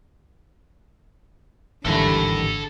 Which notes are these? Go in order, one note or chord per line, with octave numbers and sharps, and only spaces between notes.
G#1 D#2 D3 E3 G3 A4 B5